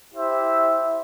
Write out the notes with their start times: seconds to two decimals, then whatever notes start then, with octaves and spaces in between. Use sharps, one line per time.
0.13 E4 G4 C5 E5